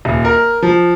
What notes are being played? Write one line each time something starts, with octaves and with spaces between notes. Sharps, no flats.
D#1
A#4
F3